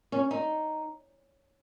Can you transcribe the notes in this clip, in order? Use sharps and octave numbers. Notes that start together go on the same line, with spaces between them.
C#4
D#4